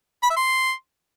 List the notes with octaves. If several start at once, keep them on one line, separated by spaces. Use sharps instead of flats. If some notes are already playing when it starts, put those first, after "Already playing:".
B5
E5
C6